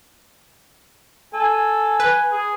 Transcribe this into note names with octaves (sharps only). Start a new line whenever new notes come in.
A4 G#5
B4
G#4